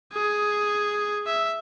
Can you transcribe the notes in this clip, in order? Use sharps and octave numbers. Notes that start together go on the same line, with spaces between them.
G#4
E5